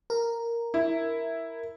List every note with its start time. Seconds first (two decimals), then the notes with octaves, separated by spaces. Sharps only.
0.10 A#4
0.74 E4